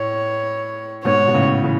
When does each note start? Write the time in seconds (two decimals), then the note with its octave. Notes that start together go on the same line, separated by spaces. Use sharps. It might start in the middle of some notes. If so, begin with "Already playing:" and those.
Already playing: A2 C#5
1.04 G#2 B2 C#5
1.28 B2
1.34 A2 C#3
1.63 C#3 E3